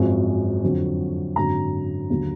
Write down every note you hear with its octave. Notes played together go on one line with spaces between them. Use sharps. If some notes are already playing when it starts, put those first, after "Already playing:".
Already playing: G#1 F#2 F3 G#3
F2 D3 F#3
G#1 F#2 D3 F#3 A#5
D#2 D3 F#3